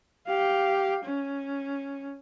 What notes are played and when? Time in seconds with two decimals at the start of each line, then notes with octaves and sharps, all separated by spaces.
0.27 G4 F5
1.05 C#4